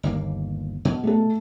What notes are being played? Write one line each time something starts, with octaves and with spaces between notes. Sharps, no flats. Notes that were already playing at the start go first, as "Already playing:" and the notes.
G1 D#2 A#3
B2
A3 A4